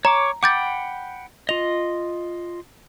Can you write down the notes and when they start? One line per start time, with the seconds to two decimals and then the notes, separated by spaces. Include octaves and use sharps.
0.05 C#5 A#5 C#6 D6
0.43 F#5 G5 B5 D6 G6 A6
1.49 F4 D#5 F7